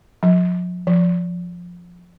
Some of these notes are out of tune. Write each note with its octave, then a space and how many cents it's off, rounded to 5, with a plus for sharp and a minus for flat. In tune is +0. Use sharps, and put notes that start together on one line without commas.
F3 +40
F3 +10